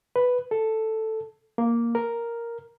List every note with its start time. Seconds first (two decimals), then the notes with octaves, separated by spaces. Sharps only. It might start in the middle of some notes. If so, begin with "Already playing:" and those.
0.16 B4
0.51 A4
1.58 A#3
1.95 A#4